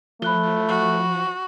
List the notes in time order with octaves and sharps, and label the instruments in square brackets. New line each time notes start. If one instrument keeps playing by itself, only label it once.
[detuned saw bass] F3 [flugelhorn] A3 [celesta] B5 F#6 G7
[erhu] F#4